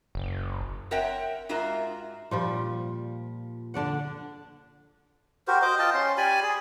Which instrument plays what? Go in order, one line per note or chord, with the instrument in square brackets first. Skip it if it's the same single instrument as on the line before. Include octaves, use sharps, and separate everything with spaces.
[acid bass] F#1
[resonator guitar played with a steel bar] C4 A#4 C#5 E5 F#5 G5
G#2 F4 F#4 A#4 E5 A#5
[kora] A#2 F3 G3
D3 D4 D5 F#5
[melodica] F#4 G4 A#4 C5
C5 D#5 D6
F4 D#5 G5 A5
C#4 C6
G4 D5 G#5 B5
G#4